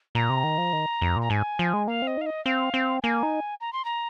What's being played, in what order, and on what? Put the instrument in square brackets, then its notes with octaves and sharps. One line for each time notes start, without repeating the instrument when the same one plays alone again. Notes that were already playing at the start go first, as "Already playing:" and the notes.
[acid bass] A#2 [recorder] A#5
[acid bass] C3
D#3
F3
D#3
F2
A#2
[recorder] A#5
[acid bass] G#2 [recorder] G#5
[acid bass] F3
G#3
[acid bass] A#3 [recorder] F5
[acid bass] C4
[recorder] D#5
[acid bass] D#4 [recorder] F5
[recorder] D#5
[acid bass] C4 [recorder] F5
[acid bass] C4
[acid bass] A#3 [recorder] G#5
[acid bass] D#4
[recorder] A#5
C6
A#5